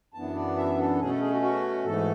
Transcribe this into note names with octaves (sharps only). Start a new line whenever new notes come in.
F#2 E3 B3 D4 A5
D5
E5
A4
B2 A3 C#4 G#4
A4
G#4
F#4
F#4
G#2 E3 A3 A4